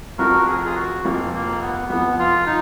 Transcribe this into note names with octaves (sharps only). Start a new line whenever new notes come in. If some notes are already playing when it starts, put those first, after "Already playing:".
F1 F2 F3 F#4 A#4
G#4
A#4
F4 G#4
F#4
F1 F2 F3 A#3
A#3
B3
F1 F2 F3 B3
F4
D#4